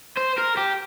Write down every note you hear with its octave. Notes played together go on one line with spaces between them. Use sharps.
C5
A#4
G4